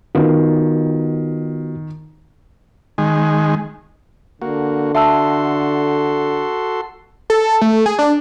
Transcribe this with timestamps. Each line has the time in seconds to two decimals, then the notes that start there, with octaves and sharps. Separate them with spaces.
0.15 D#3 B3 F4 F#4
2.98 D#3 G#3
4.42 D3 A#3 F#4
4.95 F#4 A4 E5 A5 C6 E6
7.30 A4
7.61 A3
7.86 G#4
7.99 D4